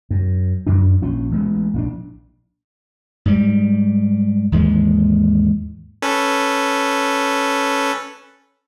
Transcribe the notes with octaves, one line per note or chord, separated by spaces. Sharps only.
F#2
F#2 F#3 D4
A#1 F3 C#4
A1 G#3 A#3 B3
A#1 C#4 D4
G#2 G3
D#2 G#2 E3 G#3
C#4 A4 B4